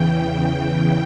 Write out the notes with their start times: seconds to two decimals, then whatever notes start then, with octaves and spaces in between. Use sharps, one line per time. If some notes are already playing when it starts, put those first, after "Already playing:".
Already playing: E2 C#3 E3 G5